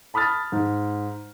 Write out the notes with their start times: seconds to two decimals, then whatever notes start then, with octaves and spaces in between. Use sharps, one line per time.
0.14 A5 B5 D#6 F6 A6
0.52 G#2